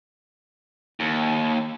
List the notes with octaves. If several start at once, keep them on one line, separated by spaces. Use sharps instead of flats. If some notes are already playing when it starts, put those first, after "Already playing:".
D#2